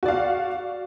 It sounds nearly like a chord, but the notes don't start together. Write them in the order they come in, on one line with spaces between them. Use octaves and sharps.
F#4 D5 F5